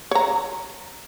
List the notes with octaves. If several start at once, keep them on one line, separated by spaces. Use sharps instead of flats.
C#5 A#5